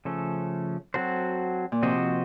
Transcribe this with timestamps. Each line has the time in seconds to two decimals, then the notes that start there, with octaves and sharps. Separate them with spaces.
0.05 C#3 F3 A3 C#4 A4
0.94 F#3 C4 F#4 A4 C5
1.72 A#2
1.82 C3 F3 C4 F#4 C5 D#5